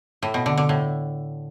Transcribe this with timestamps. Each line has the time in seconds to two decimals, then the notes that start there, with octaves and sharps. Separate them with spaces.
0.22 A2
0.34 B2
0.46 D3
0.57 D3
0.69 A2